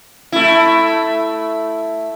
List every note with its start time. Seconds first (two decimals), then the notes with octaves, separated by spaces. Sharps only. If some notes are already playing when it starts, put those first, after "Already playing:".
0.32 A3 E4